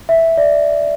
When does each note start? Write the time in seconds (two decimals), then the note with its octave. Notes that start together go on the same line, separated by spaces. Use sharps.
0.09 E5
0.37 D5